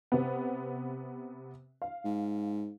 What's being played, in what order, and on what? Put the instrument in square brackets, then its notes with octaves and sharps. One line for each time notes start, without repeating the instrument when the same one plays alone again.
[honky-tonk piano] C3 B3
F5
[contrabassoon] G#2